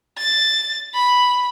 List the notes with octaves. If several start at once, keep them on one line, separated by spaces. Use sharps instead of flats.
A6
B5